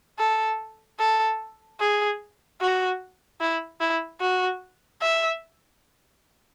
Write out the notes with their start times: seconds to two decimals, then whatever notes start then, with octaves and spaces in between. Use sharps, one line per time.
0.19 A4
0.99 A4
1.80 G#4
2.61 F#4
3.41 E4
3.81 E4
4.21 F#4
5.02 E5